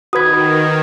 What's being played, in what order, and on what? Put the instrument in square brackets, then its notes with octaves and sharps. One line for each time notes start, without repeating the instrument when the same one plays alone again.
[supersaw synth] D#3 [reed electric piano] F#4 B4 B5 [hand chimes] D#6 G#6